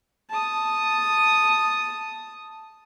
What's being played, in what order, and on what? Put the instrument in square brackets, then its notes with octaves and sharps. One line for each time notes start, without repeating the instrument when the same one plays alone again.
[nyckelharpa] A5 D#6